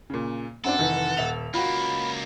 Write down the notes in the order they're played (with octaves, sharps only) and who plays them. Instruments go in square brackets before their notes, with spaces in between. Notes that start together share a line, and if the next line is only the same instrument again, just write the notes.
[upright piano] A#2 C#3
[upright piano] F#2 C4 D4 [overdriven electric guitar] A4 [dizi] F#5
[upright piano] F1 D#3 E3
D#1 E5 F7
[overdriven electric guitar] C#2 A#3 [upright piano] F4 F#4 [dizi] B5